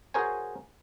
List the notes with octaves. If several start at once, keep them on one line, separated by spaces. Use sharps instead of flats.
F#4 G#4 A#4 C5 C#5 G#5